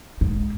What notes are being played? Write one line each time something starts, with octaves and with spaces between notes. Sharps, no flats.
G#2